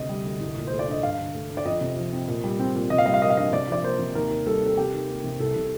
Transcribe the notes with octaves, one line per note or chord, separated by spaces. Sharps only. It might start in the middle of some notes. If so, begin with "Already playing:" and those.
Already playing: D2 C3 D#5
G3
D2
C2
A#2
A3 C5
D5
D4 D#5
G2 F5
D3
A3
D4
D5
F2 D#5
C3
F3
C4
A#2
G3
C4
A#2
C3 D#5
F5
G3 D#5
F5
A#3 D#5
F5
D4 D#5
C3 D5
F3 D5
A#3 C5
C3
D#2 A#4
D#3
G3 A4
C4 A4
C3 G4
D#3
A#3
C3
C2 A4
C3